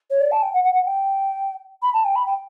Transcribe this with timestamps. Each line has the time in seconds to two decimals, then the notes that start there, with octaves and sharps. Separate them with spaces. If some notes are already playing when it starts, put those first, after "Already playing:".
0.10 C#5
0.21 D5
0.31 A5
0.42 G5
0.54 F#5
0.64 F#5
0.74 F#5
0.86 G5
1.82 B5
1.94 A5
2.05 G5
2.16 B5
2.26 G5